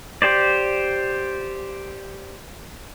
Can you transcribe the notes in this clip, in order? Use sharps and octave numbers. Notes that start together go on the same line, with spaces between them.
G4 C5 D5